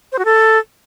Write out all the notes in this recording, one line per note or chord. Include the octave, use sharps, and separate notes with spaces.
C5
F#4
A4